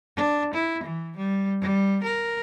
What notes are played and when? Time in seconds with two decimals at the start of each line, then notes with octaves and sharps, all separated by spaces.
0.17 D4
0.53 E4
0.83 E3
1.17 G3
1.62 G3
2.03 A#4